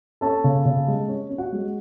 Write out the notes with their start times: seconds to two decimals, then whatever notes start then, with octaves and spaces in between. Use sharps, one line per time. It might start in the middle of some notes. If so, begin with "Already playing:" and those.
0.21 C#4 A4 A5
0.44 C#3
0.65 C#3
0.88 G#3
1.08 C#4
1.30 C#4
1.38 F#4 F#5
1.52 G#3